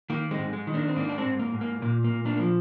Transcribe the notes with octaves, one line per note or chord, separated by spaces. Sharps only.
D#3 A#3
G#3 C4
G#2
G#3
D#3
A#3 D4
C4
G#2 A#3 D4
D4
G#3 C4
G#2
A#3
G#2
A#3
A#2 A#3
A#3
A#2
A#3 D4
F3 A#3